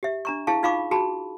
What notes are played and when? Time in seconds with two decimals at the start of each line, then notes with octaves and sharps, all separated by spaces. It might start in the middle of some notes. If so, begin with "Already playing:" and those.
0.03 G4 E5
0.25 D4 A#5 C#6
0.47 E4 G#4 F5 A5 C#6
0.63 D#4 F4 F5 B5 C#6 D6
0.91 F#4 G#4 A5 B5